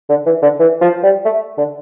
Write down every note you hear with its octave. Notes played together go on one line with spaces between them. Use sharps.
D3
E3
D3
E3
F3
G3
A3
D3